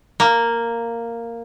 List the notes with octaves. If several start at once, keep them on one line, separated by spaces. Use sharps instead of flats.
A#3